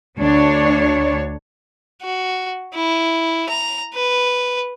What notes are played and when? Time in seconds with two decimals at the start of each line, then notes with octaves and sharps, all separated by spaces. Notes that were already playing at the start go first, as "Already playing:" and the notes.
0.19 D2 D4 C#5
2.02 F#4
2.74 E4
3.49 A#5
3.95 B4